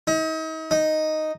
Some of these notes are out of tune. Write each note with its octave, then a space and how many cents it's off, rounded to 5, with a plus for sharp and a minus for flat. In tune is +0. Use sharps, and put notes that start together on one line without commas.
D#4 +40
D#4 +0